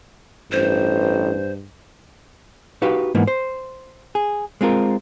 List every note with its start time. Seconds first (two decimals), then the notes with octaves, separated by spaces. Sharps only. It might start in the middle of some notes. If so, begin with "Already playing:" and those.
0.52 A1 G2 C5
2.82 D#4 F#4 G4 B4 F5
3.15 G#2 E3 A#3 B3
3.27 C5
4.15 G#4
4.61 G#3 C4 F4 A#4